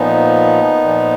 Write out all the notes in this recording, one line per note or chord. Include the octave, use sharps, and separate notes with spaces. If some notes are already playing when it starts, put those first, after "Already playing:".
Already playing: A#2 F3 B3 D#4
A#2 F3